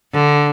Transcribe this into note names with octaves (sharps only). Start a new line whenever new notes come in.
D3